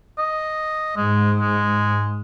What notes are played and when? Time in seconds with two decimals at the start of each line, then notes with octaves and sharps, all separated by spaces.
0.18 D#5
0.97 G#2 G#3
1.39 G#3